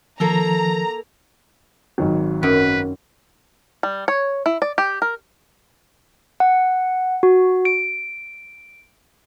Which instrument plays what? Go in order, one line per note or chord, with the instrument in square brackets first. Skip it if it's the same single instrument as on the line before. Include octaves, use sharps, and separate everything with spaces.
[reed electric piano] D#3 F3 [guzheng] A#3 A4 [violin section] A#5
[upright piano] G#1 D#3 F#3
[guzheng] F#2 [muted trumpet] B4
[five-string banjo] G3
C#5
E4
D5
G4
A#4
[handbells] F#5
F#4
D7